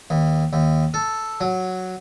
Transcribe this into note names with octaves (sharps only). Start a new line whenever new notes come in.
D#2
D#2
A4
F#3